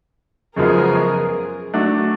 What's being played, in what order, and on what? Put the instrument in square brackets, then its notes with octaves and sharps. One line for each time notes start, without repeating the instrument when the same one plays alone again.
[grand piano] F#2 C#3 F3 G#3 B3 [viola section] G#4 A#4
[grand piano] F#3 A3 D4 F#4